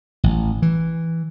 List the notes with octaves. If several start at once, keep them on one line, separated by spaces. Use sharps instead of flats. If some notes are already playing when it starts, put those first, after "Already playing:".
A1
E3